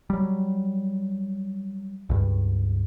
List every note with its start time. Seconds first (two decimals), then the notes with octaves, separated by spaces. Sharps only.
0.10 F#3 G3
2.09 C#2 G2